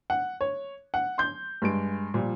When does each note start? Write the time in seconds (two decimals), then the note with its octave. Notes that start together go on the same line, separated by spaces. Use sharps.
0.10 F#5
0.41 C#5
0.94 F#5
1.18 C6 G6
1.62 G2 G#3 D7
2.14 A#2 F3 G3